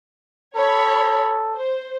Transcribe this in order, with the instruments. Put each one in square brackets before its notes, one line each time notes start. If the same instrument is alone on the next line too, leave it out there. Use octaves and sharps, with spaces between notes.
[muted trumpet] A4 [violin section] C#5 B5
[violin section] C5